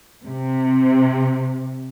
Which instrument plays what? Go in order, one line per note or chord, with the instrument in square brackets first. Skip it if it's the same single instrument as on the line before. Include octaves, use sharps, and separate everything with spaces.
[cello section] C3